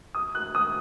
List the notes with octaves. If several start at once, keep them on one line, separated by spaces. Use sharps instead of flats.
D#6
F#6
D#6